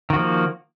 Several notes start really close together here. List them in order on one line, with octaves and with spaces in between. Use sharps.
D#3 F#4 F3 A#3